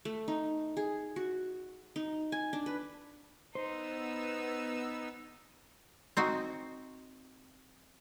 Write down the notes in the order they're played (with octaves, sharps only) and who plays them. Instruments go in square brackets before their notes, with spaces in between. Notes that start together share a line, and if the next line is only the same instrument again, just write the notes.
[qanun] A3
D#4
G#4
F#4
D#4
G#5
D4
B4
[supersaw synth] B3 E6 [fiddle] D#4 [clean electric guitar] C5
[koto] C4 D#4 F#4